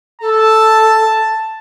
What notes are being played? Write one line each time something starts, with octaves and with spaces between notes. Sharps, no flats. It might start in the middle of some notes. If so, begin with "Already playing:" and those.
A4 A5